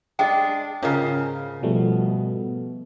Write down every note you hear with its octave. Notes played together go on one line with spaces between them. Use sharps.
G#3 D4 D#5 G5
G#2 C#3 C#4 F4 A#4
B2 F3 G3 A3